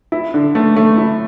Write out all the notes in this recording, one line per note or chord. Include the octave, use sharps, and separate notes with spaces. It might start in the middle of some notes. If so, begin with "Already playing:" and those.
E4
D3
A3
A3
E4